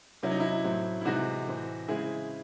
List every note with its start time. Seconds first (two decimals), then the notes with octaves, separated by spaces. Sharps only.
0.23 C3 F#3 C#4 E4
0.31 D#4
0.40 E4
0.64 A2 F#3 C4
1.01 E4
1.05 C3 E3 G#3 C4 D#4 F#4
1.47 A2 E3 C4
1.88 C#3 G#3 C4 E4 G#4